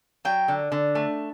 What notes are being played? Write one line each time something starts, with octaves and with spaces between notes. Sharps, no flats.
F#3 G5
D3
D3
A3